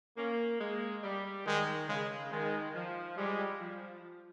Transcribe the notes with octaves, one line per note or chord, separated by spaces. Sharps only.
A#3 C#4
G#3 A#3
G3
D#3 G#3
C#3 G#3
D#3 G#3
F3
G3 G#3
F3